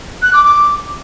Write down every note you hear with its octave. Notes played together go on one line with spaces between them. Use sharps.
F#6
D6
D6